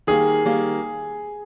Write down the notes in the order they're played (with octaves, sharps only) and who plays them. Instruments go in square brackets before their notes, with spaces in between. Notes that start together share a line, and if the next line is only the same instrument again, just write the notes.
[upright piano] D#3 G3 A#3 [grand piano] G#4
[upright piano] D#3 G3 A#3